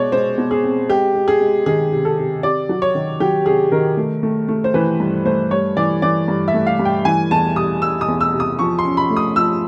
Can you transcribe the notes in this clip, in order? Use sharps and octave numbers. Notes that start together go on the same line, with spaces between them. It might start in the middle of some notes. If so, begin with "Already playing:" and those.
Already playing: B2 G#3 C#5 D5
G#3 C5
B2
G#4
C4
G#3 G4
G#3
G#4
G#3
D#3 G#4
C3
A4
C3
C3 D5
F#3
C#5
D#3
F#3 G4
C3 G#4
D#3 A#4
A3
A3
A3
C5
E3 B4
G2
A3 C5
G2 C#5
E3 D5
E3 D5
G2
E5
A3
F5
G2
G5
E3 G#5
E2 A5
G3 D#6
G3 E6
D#6
E2
E6
C3
D#6
F3 C#6
C6
C#4
B5
A3
D#6
F3 E6